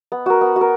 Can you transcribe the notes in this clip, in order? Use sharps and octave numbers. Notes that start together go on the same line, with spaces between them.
B3
F#4 A#4
B3
F#4
A#4